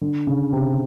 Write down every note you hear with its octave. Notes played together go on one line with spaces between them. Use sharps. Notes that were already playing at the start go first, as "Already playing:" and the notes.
D3
C#3
C3